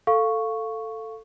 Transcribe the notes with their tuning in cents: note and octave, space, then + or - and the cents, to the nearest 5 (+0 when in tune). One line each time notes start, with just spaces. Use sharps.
A4 +10 F5 +0 C#6 +0